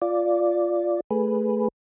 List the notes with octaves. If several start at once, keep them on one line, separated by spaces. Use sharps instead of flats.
F4 D5
A3 G#4 B4